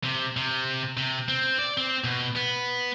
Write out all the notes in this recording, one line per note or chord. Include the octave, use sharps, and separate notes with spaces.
C3
C3
C3
C4
D5
C4
B2
B3